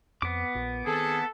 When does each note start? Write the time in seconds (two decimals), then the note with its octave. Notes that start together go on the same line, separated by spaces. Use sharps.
0.22 F2 B3 D6
0.55 A#1 A#2
0.85 D#3 C4 G#4 A4